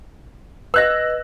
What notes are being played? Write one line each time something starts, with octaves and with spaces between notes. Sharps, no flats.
B4 D#5 E6 F#6 A#6